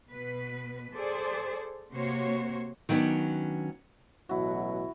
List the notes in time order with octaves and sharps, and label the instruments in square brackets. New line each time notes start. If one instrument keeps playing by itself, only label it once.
[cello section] B2 B4
G#4 A4 C5 D5
C3 A#3 F#4 C5 C#5
[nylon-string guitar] D#3 F#3 A#3 B3 C#4 D4
[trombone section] A1 B2 F#3 [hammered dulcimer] E4 F#4